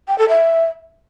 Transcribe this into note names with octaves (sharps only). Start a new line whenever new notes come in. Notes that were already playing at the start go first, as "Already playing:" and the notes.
G5
A4
E5